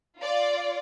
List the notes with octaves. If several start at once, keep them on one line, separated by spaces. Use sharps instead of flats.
F4 D5